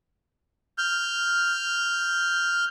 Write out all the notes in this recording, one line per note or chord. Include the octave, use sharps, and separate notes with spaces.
F6 G6